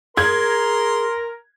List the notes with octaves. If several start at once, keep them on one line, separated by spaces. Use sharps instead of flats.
G#4 A#4 C6 G#6